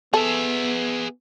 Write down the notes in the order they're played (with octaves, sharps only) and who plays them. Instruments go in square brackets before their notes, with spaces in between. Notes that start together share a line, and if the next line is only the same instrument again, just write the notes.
[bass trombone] B3 [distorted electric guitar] G#4 E5 [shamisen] A4